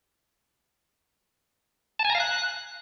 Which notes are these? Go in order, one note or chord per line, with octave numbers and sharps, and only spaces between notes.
A5
G#5
A#5
F5
F#6